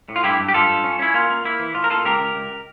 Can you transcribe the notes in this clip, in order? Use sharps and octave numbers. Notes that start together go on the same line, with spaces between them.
A2
F4
G2 E4 G4
G2
G4
G2 F4 A4
G2
C#4
C#4 E4
A#3 F4
A#3
A#3 E4
E3
A2 F4
A#4
A#3 F4 A4
C#2 G4 A#4
C#2
C#2